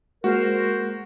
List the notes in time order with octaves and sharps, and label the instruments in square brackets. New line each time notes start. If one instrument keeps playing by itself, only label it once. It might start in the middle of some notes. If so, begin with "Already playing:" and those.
[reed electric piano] G#3 A#3 [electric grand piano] F#4 [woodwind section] A#4 C5